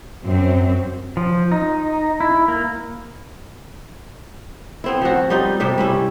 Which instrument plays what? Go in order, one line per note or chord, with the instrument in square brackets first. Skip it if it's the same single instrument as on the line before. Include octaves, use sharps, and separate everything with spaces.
[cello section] F#2 C4
[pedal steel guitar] F3
D#4
E4
A#3
[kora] B3 C4 E4
F3 F#4
G3 D#4 F4
G2 C3 G3 E5
G3 C#4 E4